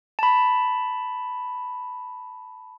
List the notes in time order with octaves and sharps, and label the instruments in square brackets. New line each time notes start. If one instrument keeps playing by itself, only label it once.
[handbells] A5 B5